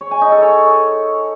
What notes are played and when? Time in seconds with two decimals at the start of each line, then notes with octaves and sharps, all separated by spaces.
0.01 C#5
0.11 G#5
0.21 D#4
0.32 A4
0.42 C#5